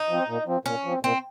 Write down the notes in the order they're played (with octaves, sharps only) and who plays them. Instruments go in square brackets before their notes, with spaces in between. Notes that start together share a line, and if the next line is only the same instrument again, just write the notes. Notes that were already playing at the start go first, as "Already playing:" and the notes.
Already playing: [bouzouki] D#4
[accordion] F3 C4
A#2
F3 C4
[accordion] A#2 [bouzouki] C#4
[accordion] F3 C4
[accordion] A#2 [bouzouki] C4